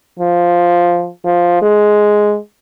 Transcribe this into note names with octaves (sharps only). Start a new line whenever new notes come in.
F3
F3
G#3